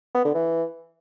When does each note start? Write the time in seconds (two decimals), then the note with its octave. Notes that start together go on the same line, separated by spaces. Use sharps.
0.15 B3
0.25 D3
0.34 E3